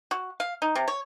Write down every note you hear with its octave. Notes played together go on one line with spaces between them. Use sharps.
F#4
F5
D#4
C3
C#5